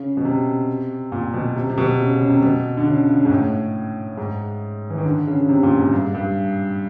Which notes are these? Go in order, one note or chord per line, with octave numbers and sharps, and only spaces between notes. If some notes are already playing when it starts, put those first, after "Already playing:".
Already playing: C#3
B2
C3
A#2
B2
C3
C3
B2
C#3
C#3
C3
B2
D3
C#3
C#3
G#2
A2
G#2
E3
D#3
D3
C#3
C#3
C3
A#2
G#2
G2
G2